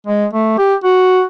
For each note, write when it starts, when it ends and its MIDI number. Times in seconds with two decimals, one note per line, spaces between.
0.07 0.26 56
0.33 0.58 57
0.58 0.75 67
0.84 1.23 66